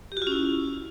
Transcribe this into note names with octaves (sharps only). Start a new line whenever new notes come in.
G4
F#4
F4
C#4
E4